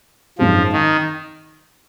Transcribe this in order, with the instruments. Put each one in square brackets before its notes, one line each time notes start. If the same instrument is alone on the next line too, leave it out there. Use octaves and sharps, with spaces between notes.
[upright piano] G#1 F#2 D#3 G#3 C4 [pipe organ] F3
[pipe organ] D#3